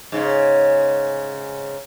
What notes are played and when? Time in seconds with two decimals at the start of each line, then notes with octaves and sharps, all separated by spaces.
0.12 G#2 C#3